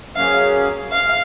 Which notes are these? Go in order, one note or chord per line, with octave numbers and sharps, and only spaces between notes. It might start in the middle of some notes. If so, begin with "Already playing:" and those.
F#3 A#3 C#4 G#4 F5
F5